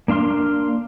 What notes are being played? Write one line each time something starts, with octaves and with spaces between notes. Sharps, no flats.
A#3 D4 F5 C6 F6